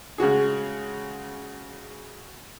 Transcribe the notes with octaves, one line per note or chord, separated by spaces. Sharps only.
C#3 G#3 F#4 G#4